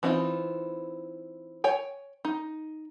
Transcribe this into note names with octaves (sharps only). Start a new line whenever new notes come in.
E3 C4 D4 D#4 F4
C#5 G5 G#5
D#4